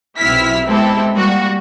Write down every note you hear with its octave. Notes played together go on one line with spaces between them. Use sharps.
B1 C3 E4 E6 F6 B6
G#3 B3 C4 E4 G4 A4
G3 A#3 F#4